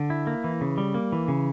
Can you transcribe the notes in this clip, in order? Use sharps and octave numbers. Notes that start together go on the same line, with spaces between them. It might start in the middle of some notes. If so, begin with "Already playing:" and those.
Already playing: D3
E4
A#3
E3
C#3
G3
A#3
E3
C#3